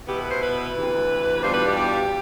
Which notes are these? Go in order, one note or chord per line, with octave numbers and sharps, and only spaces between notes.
B2 B3 E4 G4
B4
C5
B4
D2 C3 E3
E2 B2 G3 D4 F4 C5
B4
G4
G4